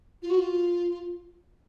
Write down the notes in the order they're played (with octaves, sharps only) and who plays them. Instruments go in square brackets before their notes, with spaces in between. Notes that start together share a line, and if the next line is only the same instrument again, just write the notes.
[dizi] F4
F#4
F4